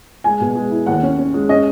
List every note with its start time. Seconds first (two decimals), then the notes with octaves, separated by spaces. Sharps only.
0.24 G#3 G#5
0.40 B2
0.55 G#3
0.71 E4
0.86 D#2 F#5
1.03 C#4
1.18 C#4
1.34 G#3
1.49 C#4 D#5